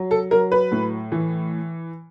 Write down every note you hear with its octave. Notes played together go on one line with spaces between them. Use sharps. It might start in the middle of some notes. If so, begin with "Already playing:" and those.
Already playing: F#3
A4
F#3 A#4
B4
A2
E3